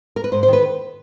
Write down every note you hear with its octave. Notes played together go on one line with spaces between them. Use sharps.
A#4
B4
G#2 C5
C5
D#3 B4